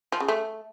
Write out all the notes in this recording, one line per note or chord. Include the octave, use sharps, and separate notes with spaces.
F3
C#3
A3